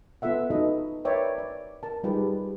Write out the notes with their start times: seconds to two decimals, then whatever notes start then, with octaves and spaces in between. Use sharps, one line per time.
0.22 B3 F4 A4 E5 F#5
0.50 D#4 F#4 A4 B4 D#5
1.05 A#4 B4 C#5 D5 E5 G5
1.38 D5
1.83 A#4 A5
2.04 G3 D#4 F4 G4 G#4 B4